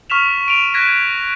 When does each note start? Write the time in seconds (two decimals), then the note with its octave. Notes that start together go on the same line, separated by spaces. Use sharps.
0.10 C#6 F6 B6 E7 F7
0.47 C#6 D7 D#7 F7
0.74 F#6 G#6 A#6 B6